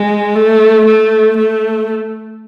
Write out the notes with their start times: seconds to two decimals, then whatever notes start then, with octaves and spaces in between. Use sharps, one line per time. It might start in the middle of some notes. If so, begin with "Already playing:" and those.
Already playing: G#3
0.35 A3
0.86 A3
1.37 A3